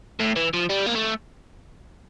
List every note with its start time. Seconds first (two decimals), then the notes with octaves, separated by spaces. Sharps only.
0.20 A2
0.36 E3
0.54 F3
0.70 G3
0.87 A#3
0.96 A3